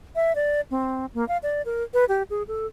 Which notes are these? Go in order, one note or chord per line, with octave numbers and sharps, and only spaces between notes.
E5
D5
C4
A#3
F5
D5
A#4
B4
G4
G#4
A4